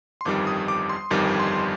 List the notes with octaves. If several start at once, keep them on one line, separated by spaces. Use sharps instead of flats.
C6
G1 F2 D#3 G3 D6
D#6
D6
C6
G1 F2 D#3 G3 D6
C6